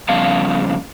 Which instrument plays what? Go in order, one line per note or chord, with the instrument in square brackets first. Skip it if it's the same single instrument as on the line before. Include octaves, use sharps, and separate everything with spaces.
[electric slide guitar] F2 C#3 G3 B3 F5 A5